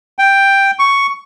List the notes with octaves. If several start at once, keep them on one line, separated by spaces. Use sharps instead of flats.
G5
C#6